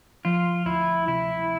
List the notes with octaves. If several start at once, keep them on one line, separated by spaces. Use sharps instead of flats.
F3 F4
D2 E4
C3 E4